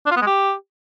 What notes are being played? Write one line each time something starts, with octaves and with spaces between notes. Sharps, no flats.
D4
F4
B3
G#3
G4